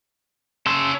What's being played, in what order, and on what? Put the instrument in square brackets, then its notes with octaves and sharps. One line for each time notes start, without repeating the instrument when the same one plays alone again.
[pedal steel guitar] C#3 C6 E6 [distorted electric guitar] C#5 A5